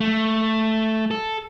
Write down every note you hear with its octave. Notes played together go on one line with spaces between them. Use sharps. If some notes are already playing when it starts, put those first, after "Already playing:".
A3
A4